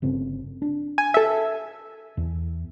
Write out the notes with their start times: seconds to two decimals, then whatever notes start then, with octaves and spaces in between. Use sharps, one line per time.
0.02 G1 C#3 C4
0.62 D4
0.98 G#5
1.14 A4 E5
2.17 E2